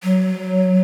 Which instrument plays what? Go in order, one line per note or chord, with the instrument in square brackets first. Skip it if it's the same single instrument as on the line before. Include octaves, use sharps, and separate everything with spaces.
[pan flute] F#3